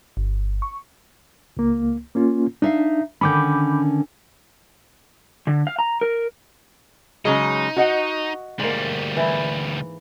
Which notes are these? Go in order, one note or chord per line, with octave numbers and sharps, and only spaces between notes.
G1
C#6
C#2 A#3
A#3 C#4 F4
D4 D#4 E5 F5
D3 D#3 C#4 B5 D6 G6
D3
F5
A#5
A#4
C#3 F#3 G#3 D#4
F#4 D#5 F#5
D2 G#2 G3 A#3
E3 E4